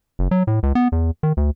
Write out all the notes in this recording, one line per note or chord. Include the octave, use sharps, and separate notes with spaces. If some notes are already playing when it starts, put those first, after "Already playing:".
F#1
F#3
A2
C#2
B3
E2
D#3
D2